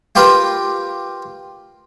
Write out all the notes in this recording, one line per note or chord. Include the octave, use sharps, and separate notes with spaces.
F4 G4 A#4 B4